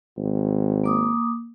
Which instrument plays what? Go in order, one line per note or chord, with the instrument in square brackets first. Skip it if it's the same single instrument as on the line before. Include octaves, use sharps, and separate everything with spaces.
[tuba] G#1
[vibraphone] A#3 D6 D#6